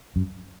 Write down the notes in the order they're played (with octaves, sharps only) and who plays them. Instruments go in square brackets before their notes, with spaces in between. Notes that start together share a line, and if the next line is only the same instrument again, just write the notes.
[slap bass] F#2